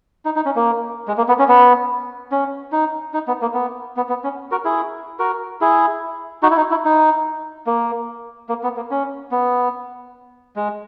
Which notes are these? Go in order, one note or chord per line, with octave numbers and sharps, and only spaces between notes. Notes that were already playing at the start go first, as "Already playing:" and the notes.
D#4
D#4
C#4
A#3
G#3
A#3
B3
C#4
B3
C#4
D#4
D#4
B3
A#3
B3
B3
B3
C#4
F#4 A#4
E4 G#4
F#4 A#4
E4 G#4
D#4 F#4
E4
D#4
E4
D#4
A#3
A#3
B3
A#3
C#4
B3
G#3